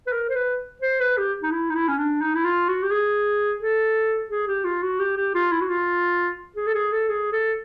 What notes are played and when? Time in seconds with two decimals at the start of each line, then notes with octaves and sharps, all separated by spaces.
0.07 B4
0.12 A#4
0.29 C5
0.36 B4
0.82 C5
1.00 B4
1.17 G4
1.43 D#4
1.52 E4
1.69 D#4
1.75 E4
1.88 C#4
1.98 D4
2.21 D#4
2.35 E4
2.45 F4
2.68 F#4
2.83 G4
2.91 G#4
3.61 A4
4.31 G#4
4.48 G4
4.64 F4
4.82 F#4
5.00 G4
5.17 G4
5.34 F4
5.52 E4
5.61 F#4
5.70 F4
6.56 G#4
6.66 A4
6.75 G#4
6.92 A4
7.09 G#4
7.32 A4